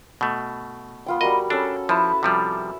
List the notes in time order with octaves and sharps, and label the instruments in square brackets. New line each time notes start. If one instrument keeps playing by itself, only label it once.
[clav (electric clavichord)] B2 A3
[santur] B3 F4 G5
[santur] G3 F#4 A#4 [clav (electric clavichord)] D#5
[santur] C#4 A4 [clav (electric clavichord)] D4
[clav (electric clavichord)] F3 [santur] E4 B4 A5
[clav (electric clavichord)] C3 F3 G3